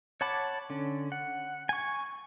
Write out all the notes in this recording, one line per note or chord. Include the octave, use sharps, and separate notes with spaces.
C#5 F#5 A5 B5 D6
D3 C#4
F#5
G#5 C#6